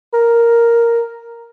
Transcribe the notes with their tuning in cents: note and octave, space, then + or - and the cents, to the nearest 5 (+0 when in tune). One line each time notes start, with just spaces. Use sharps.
A#4 +0